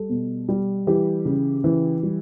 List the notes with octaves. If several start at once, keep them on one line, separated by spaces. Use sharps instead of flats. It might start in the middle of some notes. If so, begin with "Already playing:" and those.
Already playing: G3 A4
B2
G3
E3 G4
C#3
E3
G3